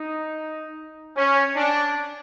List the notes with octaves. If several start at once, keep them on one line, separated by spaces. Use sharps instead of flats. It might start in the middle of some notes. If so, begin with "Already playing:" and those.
Already playing: D#4
C#4
D4